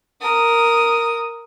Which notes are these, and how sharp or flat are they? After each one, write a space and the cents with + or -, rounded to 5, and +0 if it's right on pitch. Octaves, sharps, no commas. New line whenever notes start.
A#4 +0 D#6 +0